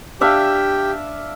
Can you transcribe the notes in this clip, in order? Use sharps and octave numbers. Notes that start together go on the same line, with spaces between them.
D4 G4 E5 F5